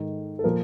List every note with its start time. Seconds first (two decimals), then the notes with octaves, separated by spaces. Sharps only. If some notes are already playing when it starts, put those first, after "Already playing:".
Already playing: G#2 D#3 A4
0.39 A4
0.44 A#2 F3 A#4